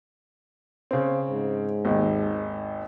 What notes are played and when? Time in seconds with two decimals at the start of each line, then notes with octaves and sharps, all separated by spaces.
0.91 C#3 C4
1.29 G#2
1.85 G#1 D#2